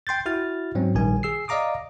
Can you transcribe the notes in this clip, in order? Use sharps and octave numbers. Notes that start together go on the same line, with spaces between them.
G5 C6 G6 A6
E4 F#4 F6 A6
G#2 F#3 C4 C#4
A#1 D#3 G3 G#5
G#4 E6 C7
D5 D#5 F5 A#5 D6 D#6